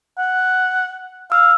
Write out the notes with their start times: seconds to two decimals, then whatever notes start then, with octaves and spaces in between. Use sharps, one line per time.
0.18 F#5
1.32 F5 E6